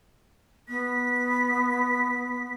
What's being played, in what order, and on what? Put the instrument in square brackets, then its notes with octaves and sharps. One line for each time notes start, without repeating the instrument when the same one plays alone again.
[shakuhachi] B3 [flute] B6